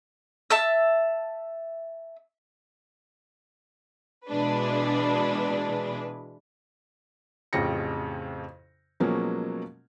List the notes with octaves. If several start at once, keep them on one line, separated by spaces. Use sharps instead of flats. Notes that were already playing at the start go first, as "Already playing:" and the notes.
E5 A5 E6
B2 E3 G#3 D4 B4
A1 F2 C#3 G5 A#6 C#7
B2 F3 F#3 G#3 A#3 C#4